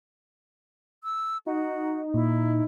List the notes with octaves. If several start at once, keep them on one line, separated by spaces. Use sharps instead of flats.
E6
D#4 F#4
A#2 E4